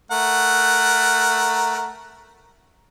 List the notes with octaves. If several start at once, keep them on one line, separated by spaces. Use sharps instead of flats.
A3 A#4 F#5